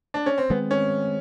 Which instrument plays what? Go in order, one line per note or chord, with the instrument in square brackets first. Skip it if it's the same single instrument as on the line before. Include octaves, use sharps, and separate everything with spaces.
[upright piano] D4
C#4
C4
[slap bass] D#3 G#3 C4 [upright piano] B3
[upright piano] C#4